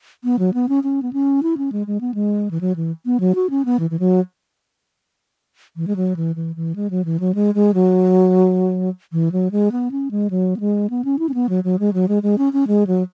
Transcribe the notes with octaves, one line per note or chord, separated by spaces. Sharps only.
B3
F#3
B3
C#4
C#4
B3
C#4
E4
C#4
G#3
G#3
B3
G#3
E3
F#3
E3
B3
F#3
F#4
C#4
B3
E3
E3
F#3
E3
G#3
F#3
E3
E3
E3
G#3
F#3
E3
F#3
G#3
G#3
F#3
E3
F#3
G#3
B3
C#4
G#3
F#3
B3
G#3
B3
C#4
E4
C#4
B3
F#3
F#3
G#3
F#3
G#3
G#3
C#4
C#4
G#3
F#3